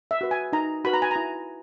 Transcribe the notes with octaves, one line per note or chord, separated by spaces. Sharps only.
E5
F#4 B4
G#5
D#4 A#5
F#4 B4 B5
A#5
G#5
E4 A#5